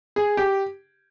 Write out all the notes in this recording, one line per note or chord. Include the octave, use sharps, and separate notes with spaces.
G#4
G4